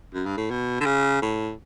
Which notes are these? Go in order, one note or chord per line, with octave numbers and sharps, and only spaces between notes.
F#2
G2
A2
B2
D3
C#3
A2